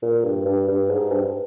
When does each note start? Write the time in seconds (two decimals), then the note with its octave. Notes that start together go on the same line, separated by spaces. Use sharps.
0.02 A#2
0.24 G2
0.46 G2
0.68 G2
0.90 G#2
1.12 G2